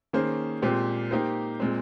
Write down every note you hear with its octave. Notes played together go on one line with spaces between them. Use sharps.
D#3 A#3 C#4 G#4 C5
A#2 G#3 C4 G4 C5
A#3 D#4 G4 C5
A#2 G#3 C4